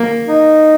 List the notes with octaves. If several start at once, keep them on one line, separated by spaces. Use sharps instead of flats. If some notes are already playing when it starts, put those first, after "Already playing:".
Already playing: A#3
D#4